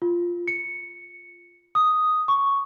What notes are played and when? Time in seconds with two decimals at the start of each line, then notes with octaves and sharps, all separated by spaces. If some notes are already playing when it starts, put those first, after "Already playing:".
0.02 F4
0.48 C#7
1.75 D#6
2.28 C#6